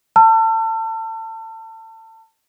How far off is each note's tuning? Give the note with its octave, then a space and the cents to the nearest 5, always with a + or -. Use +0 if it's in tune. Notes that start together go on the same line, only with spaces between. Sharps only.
A5 +30 E6 +45